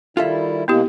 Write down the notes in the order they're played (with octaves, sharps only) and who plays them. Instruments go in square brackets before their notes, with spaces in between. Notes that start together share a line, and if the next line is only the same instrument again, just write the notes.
[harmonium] D#3 G3 E4 [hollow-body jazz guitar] F4 A4 E5
[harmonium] C3 G#3 A#3 [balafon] B3 E4 G4